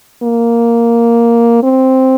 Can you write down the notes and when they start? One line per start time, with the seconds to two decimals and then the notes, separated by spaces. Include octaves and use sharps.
0.23 A#3
1.63 C4